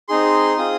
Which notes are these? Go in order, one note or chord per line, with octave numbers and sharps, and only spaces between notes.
C4 D#4 G#4 C6
C4 F4 G#4 D#6